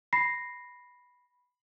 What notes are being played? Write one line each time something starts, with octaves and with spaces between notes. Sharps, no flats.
B5 A#6 C7